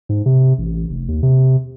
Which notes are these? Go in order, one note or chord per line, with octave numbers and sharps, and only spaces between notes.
G#2
C3
A1
F1
D#2
C3